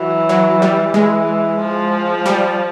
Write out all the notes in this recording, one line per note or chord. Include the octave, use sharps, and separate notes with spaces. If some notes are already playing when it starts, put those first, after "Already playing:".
Already playing: E3 F#3
F#3
G3
E3 G#3
F3
G3